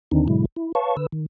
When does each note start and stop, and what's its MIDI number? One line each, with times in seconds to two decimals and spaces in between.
0.11 0.27 39
0.11 0.27 50
0.11 0.27 51
0.11 0.27 60
0.11 0.27 62
0.11 0.27 63
0.28 0.45 44
0.28 0.45 47
0.28 0.45 50
0.28 0.45 54
0.28 0.45 56
0.28 0.45 64
0.56 0.72 64
0.75 0.96 71
0.75 0.96 73
0.75 0.96 77
0.75 0.96 81
0.75 0.96 85
0.97 1.07 50
0.97 1.07 71
0.97 1.07 88
1.12 1.26 51